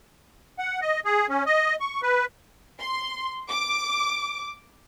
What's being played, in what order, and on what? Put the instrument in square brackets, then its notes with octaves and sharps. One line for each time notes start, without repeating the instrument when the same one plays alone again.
[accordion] F#5
D#5
G#4
C#4
D#5
C#6
B4
[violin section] C6
D6